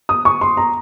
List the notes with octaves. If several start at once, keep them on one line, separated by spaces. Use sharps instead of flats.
D#6
C#6
C6
A#5